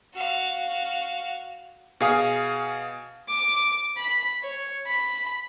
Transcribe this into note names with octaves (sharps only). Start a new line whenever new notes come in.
F#4 F5
B2 G#4 F5 G#5 D#6
D6
B5
C#5
B5